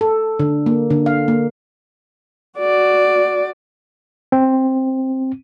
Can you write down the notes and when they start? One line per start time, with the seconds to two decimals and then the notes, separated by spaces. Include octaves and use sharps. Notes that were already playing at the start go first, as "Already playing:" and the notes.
0.01 A4
0.39 D3
0.66 A#3
0.90 D3
1.06 F5
1.28 A#3
2.59 F#4 D5
4.32 C4